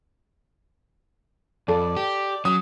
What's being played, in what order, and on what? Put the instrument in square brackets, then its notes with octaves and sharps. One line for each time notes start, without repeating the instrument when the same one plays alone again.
[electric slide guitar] F2 [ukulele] A4 [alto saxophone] D5
[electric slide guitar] G4
[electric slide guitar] F#3 [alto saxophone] C#4 [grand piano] D#6